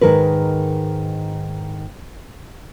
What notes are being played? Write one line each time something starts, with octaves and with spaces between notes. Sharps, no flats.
G#2 D#3 A#4 B4